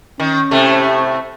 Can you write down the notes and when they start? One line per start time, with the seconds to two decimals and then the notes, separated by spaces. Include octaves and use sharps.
0.20 D#3 C#4
0.51 A2 C3 A3